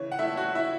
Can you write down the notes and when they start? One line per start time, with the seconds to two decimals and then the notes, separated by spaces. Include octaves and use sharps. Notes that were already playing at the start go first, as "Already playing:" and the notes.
Already playing: C#3 E3 C#5
0.12 F#5
0.19 A3 E4 E5
0.37 F#4 F#5
0.55 E4 E5